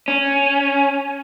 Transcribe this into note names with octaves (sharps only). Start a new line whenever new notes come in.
C#4